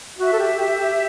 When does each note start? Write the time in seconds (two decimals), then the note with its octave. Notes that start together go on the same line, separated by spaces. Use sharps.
0.19 F#4 E5
0.33 A4
0.40 G4
0.59 G4
0.79 G4